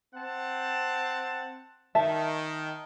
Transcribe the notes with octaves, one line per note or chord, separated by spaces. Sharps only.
C4 F#5 A5
D#3 E5 A5